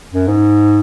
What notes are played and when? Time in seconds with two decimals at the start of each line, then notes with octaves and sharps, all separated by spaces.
0.13 F#2
0.28 G#2